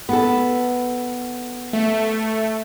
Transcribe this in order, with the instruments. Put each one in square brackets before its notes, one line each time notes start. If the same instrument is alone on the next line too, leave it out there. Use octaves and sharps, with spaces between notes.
[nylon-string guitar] B3 A4
[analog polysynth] A3